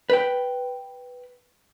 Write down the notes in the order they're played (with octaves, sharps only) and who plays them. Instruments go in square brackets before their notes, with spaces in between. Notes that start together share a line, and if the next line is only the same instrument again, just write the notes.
[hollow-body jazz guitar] B4 G5